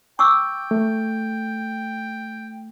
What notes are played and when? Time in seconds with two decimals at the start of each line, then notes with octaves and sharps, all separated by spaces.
0.19 G5 C#6 D6 E6
0.71 A3